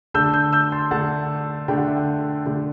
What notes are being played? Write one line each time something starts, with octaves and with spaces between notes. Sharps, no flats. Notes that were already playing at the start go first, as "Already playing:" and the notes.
D3 A3 D4 E6 G6
E6 G6
E6 G6
A5 C6
D3 A3 D4 F#5 A5
D3 A3 D4 G5
F#5
E5
F#5
D3 A3 D4